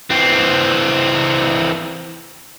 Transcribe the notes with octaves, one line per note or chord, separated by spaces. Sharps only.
E3 C4